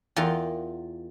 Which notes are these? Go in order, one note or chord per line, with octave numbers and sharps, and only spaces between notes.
E2 F4 A#4 F#5 G5